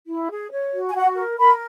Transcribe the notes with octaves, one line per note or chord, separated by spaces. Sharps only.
E4
G#4
C#5
F#4
G#5
F#4 F#5
A#4
A#4 B5